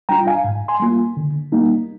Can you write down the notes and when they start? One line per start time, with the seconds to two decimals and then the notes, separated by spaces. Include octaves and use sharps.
0.09 G3 D4 F4 G5 A#5
0.27 F5 G#5
0.44 G#2
0.68 G#5 C6
0.80 G3 A#3 F4
1.17 D3
1.52 G3 A#3 D#4